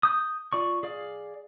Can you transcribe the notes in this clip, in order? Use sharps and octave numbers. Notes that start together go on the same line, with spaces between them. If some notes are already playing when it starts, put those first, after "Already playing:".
D#6 G6
F4 D5 C#6
G#4 D5 F5